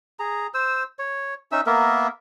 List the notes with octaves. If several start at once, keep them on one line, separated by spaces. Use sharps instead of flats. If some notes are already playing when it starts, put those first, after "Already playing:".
G#4 A#5
C5 E6
C#5
C#4 D#4 E5 E6
A#3 B3 A#4 E5